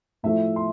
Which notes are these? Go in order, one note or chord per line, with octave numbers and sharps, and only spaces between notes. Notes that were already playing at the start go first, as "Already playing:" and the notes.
A2 F3 A3 E4 E5
C6